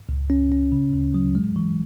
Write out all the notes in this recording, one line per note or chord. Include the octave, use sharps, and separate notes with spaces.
C#2
C#4
C#4
C#3
D2
F#3
G#3
E3